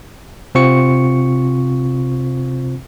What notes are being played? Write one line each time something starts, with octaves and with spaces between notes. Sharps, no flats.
C3 C4 F4 C5 C#6 C#7